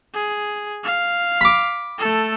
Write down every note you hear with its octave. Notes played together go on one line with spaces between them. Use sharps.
G#4
F5
B5 D6
A3 A4